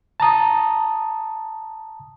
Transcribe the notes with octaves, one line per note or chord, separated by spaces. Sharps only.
A5 A#5 D#6